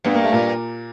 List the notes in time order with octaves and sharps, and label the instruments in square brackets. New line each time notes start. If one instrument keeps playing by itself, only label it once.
[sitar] G2 [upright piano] B3
[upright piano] A#3
A3
A#2 A#3